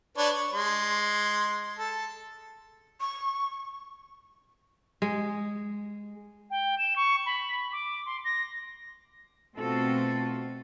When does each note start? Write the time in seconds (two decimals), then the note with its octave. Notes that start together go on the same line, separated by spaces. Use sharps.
0.18 D4 B4 C#5
0.32 C#6
0.53 G#3 C6
1.79 A4
3.00 C#6
5.02 G#3
6.50 G5
6.78 E7
6.96 C#6
7.26 B5
7.72 D6
8.06 C6
8.24 A#6
9.57 B2 A3 C4 F4 F#4 A4